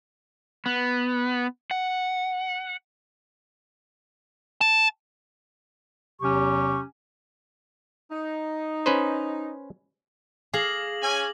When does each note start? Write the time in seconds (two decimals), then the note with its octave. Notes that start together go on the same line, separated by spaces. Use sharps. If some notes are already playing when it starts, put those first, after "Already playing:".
0.66 B3
1.71 F#5
4.61 A5
6.22 E2 C3 F#3 C#4 G4 C#6
8.11 D#4
8.86 C#4 B4 C5
10.54 G#4 F5 D6 A#6 F#7
11.03 C#4 G#5